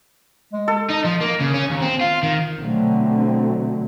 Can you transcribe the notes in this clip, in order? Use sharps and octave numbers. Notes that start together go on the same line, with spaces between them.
G#3
A4
D#4
F3
A#3
C#3
C#4
D#2
C4
F4
D#3
B2 D3 F#3 A3 C4